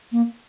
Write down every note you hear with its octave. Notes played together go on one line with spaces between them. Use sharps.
A#3